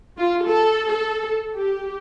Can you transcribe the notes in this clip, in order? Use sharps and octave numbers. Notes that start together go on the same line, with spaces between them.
F4
A4
A4
G4